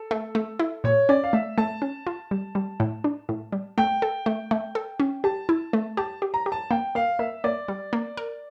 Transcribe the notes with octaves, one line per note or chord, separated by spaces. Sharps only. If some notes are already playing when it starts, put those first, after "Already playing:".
Already playing: A4
A3
A3
E4
A#2 C#5
C#4 D5
F5
A3 E5
A3 A5
C#4
F4
G3
G3
A2
D4
A2
G3
A3 G5
A4
A3
A3
A4
C#4
G4 A5
E4
A3
G4 A5
G4
A#5
G4
A5
A#3 G5
A#3 F5
A#3 E5
A#3 D5
G3
A#3
A#4